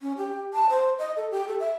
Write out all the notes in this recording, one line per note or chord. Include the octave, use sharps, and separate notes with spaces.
C#4
G4
A5
C5
D#5
A4
G4
A4
E5